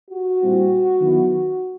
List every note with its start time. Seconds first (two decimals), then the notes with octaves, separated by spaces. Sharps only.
0.11 F#4
0.41 A#2 G3 C4 E4
1.00 D#3 F#3 B3 E4